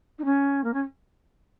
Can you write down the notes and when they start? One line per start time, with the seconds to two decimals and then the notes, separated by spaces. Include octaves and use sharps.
0.18 D#4
0.25 C#4
0.64 A#3
0.73 C#4